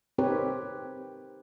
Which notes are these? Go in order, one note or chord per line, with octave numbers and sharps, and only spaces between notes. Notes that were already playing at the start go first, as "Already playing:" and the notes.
C4 D#4 G4 A#4 B4 C#5